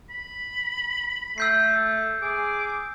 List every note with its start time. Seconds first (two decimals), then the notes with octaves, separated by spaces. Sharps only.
0.10 B5
1.38 A3 E6 G6 C7
2.22 G#4 D6